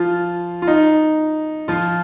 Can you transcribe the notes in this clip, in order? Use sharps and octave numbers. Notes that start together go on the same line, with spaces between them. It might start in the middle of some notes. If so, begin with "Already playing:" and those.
Already playing: F3 F4
F4
D#4
F3 F4